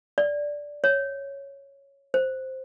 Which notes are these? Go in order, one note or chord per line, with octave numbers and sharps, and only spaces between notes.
D5
C#5
C5